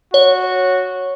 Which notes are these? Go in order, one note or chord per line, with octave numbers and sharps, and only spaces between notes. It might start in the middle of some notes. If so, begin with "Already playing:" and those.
F#4 C#5